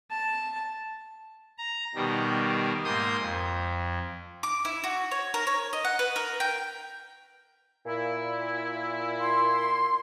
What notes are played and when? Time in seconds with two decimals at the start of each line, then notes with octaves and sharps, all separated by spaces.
0.11 A5
1.58 A#5
1.95 B2 D#3 G3
2.85 G#2 A#3 C6 D#6 G6
3.19 F2
4.43 D6
4.65 E4
4.84 F#4
5.11 C#5
5.34 A#4
5.47 C#5
5.73 D#5
5.85 F#5
5.99 B4
6.16 A#4
6.40 G5
7.86 A#2 E4
9.20 C6